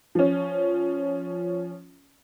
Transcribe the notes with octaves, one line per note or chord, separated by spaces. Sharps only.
F3 C#4